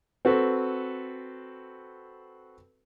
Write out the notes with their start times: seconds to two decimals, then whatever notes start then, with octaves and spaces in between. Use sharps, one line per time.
0.25 C4 F#4 A4 B4